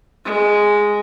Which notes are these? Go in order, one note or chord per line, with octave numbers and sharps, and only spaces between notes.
G#3